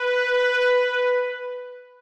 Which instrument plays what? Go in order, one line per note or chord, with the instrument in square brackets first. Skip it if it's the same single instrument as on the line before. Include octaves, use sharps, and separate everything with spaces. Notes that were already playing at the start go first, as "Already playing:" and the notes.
Already playing: [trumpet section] B4